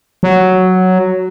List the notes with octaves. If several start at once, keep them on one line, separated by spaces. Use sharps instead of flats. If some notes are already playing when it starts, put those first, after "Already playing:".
F#3